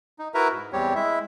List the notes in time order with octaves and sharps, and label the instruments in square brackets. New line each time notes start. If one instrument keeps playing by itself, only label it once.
[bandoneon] D#4
E4 F#4 A#4 B4 E5 A#5
G#2
E2 G3 C4 G4 C#5
G#3 E4 E5